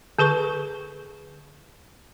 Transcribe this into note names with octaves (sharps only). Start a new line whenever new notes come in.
D3 G#4 B4 C#6